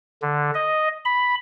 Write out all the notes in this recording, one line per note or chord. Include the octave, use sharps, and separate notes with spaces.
D3
D#5
B5